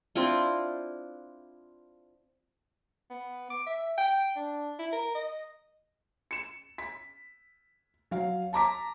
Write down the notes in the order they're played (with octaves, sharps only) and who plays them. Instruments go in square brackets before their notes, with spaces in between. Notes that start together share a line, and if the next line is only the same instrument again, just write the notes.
[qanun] C4 D4 E4 F4
[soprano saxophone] B3
D6
E5
G5
D4
E4
A#4
D#5
[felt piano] C#7 E7
B6
F#3 F5
A5 A#5 D6 B6